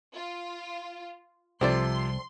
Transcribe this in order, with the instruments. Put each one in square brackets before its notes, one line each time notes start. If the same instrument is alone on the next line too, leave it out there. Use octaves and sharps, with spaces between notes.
[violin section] F4
[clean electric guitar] C2 [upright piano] C3 F3 [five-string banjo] C4 A4 D5 [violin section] C6